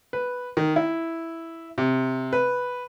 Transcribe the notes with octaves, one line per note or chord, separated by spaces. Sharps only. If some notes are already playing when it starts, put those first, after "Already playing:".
B4
D#3
E4
C3
B4